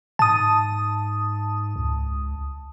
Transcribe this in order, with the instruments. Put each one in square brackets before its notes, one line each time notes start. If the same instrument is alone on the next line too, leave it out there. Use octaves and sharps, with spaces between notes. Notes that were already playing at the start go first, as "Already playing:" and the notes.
[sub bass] G#2 [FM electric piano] A5 D#6
[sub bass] C#2